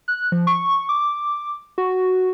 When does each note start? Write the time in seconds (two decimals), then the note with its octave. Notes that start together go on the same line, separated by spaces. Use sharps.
0.08 F#6
0.32 F3
0.47 C#6
0.89 D6
1.78 F#4